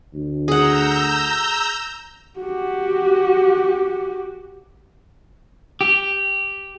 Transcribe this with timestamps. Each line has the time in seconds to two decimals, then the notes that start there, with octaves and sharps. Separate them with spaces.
0.14 D2
0.48 G#4 F#5 A#5 E6 G6
2.39 F#4 G4
5.81 G4